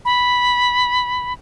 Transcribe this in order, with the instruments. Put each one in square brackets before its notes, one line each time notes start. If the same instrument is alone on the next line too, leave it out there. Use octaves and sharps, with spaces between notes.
[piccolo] B5